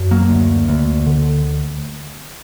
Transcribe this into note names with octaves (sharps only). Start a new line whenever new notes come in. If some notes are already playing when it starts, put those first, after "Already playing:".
Already playing: F#2
F#3 A#3
D2
D2
D3